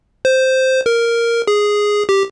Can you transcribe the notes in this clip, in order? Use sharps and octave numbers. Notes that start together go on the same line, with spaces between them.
C5
A#4
G#4
G4